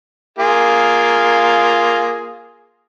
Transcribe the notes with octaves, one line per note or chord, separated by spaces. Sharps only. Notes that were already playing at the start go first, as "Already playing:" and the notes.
A#3 F4 G#4